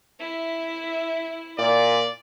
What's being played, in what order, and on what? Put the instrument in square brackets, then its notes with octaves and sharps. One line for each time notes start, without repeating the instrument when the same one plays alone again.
[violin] E4 E5
[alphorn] A#2 [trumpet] D5